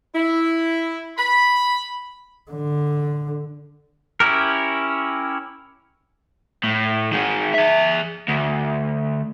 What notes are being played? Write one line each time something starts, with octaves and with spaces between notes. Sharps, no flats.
E4
B5
D3
C#4 E4 G4 A#4
A2
D#3 G#3
G#4 E5
D2